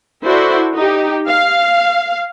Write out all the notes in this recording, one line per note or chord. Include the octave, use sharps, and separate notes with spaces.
E4 F#4 A4 C5 D5 E5
D#4 G4
F5